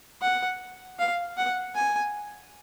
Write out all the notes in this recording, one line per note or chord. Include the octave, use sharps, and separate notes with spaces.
F#5
F5
F#5
G#5